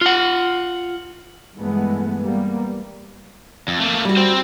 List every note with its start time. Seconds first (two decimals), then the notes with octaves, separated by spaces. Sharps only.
0.01 F4 F#5
1.55 G2 E3 G#3 A3 B3
2.20 G3 A#3 B3
3.68 F2
3.80 A3 A#3
4.05 G3 F#4
4.17 C4 C5